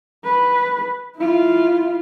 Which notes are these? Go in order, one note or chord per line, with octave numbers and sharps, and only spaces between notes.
B4
E4 F4